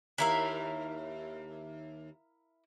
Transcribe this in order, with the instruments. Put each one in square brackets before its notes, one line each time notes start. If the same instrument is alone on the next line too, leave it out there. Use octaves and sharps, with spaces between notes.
[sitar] D#2 E5 [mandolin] E4 A#4 F5